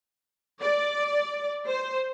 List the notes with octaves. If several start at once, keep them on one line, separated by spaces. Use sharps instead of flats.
D5
C5